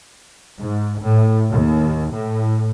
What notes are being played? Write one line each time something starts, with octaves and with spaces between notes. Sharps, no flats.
G#2
A2
D#2
A2